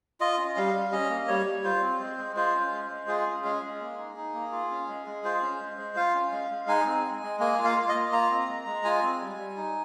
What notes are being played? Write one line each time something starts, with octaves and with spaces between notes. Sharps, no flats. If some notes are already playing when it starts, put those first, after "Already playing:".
F4 D#5
C#4
G3 F5
G3
C#4 D#5
A#3
G3 C#5
G3
F4 C5
C4
G#3
G#3
F4 C5
C#4
G#3
G#3
F4 G#4
C#4
G#3 G#4
G#3
A#3
D#4
D#4
A#3
F4
C#4
G#3
G#3
F4 C5
C#4
G#3
G#3
F4 F5
C#4
G#3
G#3
D#4 G#5
C4
G#3
G#3
A#3 G#5
F4
F5
F4
D#5
A#3
F4 A#5
C4
G#3
G#3
F4 G#5
C4
G3
G3
D#4